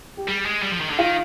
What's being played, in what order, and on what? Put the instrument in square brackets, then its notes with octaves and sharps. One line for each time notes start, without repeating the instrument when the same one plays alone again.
[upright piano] G4
[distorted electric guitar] G3 [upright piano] G#4
[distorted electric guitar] G#3
G3
F3
D#3
D3
[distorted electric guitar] D#3 [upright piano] F4